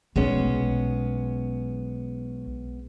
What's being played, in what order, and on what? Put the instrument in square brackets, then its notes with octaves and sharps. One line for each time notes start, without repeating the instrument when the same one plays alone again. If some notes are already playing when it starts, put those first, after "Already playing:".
[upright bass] B1 [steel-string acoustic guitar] G#3 B3 C#4